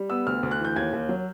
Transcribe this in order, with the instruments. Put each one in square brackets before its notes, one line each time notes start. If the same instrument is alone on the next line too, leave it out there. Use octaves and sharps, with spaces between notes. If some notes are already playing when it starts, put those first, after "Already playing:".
Already playing: [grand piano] G3
B3 E6
D2 F6
D2
F#6
E3
G6
D#2 G#6
D#2
F#3